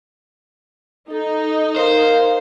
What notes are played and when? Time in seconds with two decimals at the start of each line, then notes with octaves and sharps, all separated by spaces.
1.10 D#4 A4
1.76 A#4 C5 F5